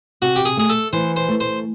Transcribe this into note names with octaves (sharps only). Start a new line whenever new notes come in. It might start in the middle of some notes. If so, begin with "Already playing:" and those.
C3 F#4
G4
G#4
A3 G#4
A4
E3 C5
C5
A3
C5